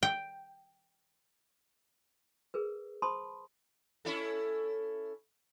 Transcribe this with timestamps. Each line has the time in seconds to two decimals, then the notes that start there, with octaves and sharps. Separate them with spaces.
0.03 G5
2.54 G#4 A#4 B4
3.02 C5 A5 B5 C6 D#6
4.05 C#4 E4 A4